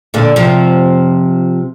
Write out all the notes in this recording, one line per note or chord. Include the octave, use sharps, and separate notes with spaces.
A#2 D3
C3 F3